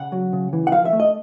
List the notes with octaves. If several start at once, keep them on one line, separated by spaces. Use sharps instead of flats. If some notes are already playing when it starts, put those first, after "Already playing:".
Already playing: C#3 F#5
F#3
C#3
E3
F#5
F3 F5
E5
A3
D#5